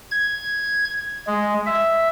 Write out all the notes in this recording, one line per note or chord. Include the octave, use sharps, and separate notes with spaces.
G#6
G#3
E5